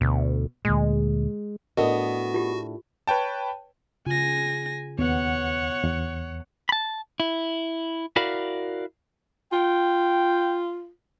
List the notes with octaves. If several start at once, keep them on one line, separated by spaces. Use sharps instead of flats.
D2 B2
D2 A#2 G#3
A2 B3 D4 F#4 A4 A#4 D#5
F4 G4
B4 C#5 G5 A5
C#3 F4 G#5 A#6
D#2 B3 C#5 F#5
E2
A5 B5
E4
E4 F#4 A#4 D5 F5 B5
F4 G5